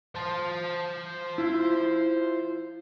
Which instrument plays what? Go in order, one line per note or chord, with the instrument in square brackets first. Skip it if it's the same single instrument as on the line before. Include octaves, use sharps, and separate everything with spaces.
[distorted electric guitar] C5 A5
[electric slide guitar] E4 F4